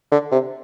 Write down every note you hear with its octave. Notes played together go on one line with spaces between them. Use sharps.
D3
C3